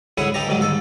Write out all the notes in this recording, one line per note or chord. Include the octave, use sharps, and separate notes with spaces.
D2 G#2 E4 G#4 C#5 F#5
G2 D#4 G4 D5 A5 A#5
D2 G#2 D#3 F#3 G3
D#2 G#2 A4